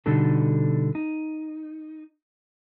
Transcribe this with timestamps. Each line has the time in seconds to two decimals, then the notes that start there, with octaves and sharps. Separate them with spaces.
0.06 B2 D3 G3 D#4 A4
0.95 D#4